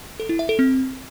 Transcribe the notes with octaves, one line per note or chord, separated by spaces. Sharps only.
A4
E4
E5
A4
C4